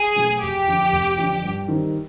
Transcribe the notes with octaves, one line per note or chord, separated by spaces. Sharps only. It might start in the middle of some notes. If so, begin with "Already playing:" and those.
Already playing: G#4
B2 F#3 A3
F1 G4
F2 D3
F1
F2 D3
G2
D#3 G3 C4